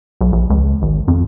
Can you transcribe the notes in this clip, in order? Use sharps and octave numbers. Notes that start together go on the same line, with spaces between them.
B1
A#1
C#2
G#1
F2